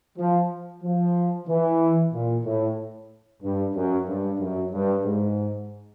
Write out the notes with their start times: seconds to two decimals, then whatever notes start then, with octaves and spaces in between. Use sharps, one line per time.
0.18 F3
0.83 F3
1.47 E3
2.13 A#2
2.45 A2
3.43 G2
3.75 F#2
4.07 G2
4.39 F#2
4.72 G2
5.05 G#2